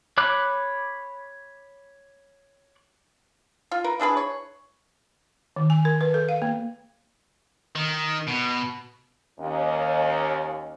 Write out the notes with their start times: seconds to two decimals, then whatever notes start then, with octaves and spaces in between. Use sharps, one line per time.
0.18 C#5 B5 D6 F#6
3.71 F4
3.84 A#4 B4
4.00 E3 D4 G#4 B4
4.17 C#5
5.56 D#3
5.70 G#5
5.85 A#4
6.01 B4
6.14 A4
6.29 F5
6.42 A#3
7.75 D#3
8.28 B2
9.39 D#2 C#4